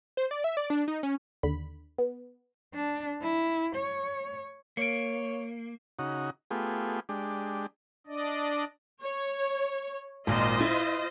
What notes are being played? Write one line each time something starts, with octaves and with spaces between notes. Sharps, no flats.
C5
D5
E5
D5
D4
D#4
C#4
D#2 D3 B5
B3
D4
E4
C#5
A#3 C#5 C#7 D7
C#3 D#4 F#4
A3 B3 F4 G4 G#4
G#3 D4 G4
D4 D5 D#5
C#5
G#1 A#2 F4 C5 D#5
E4